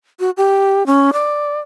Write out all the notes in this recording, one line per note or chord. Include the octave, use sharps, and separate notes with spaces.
F#4
G4
C#4
D5